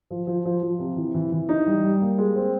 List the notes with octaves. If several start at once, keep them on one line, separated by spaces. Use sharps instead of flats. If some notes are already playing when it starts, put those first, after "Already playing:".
F3
F3
F3
F3
C3
E3
E3
E3
D#4
G3
G3
A#3
G#3
C4